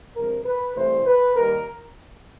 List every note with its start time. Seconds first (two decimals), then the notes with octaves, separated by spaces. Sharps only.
0.15 D2 C3 F3 G#3 A#4
0.45 B4
0.75 C2 C3 E3 A3 C5
1.06 B4
1.36 D#2 D#3 G3 A#4